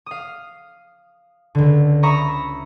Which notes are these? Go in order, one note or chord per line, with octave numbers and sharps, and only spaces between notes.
F5 D#6
C#2 D3
E5 A#5 B5 C#6 D#6